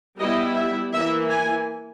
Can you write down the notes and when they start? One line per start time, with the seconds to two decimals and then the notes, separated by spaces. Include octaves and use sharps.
0.19 G3 B3 E4 D#5
0.56 E5
0.93 E3 A#3 E4 E5
1.30 G#5